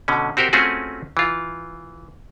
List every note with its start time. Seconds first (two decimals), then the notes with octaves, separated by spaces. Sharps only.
0.08 B2 D3 C#4
0.37 C4 F#4 G4 A#4 C5
0.53 A3 C4 C#4 F4 F#4 G#4
1.17 E3 F4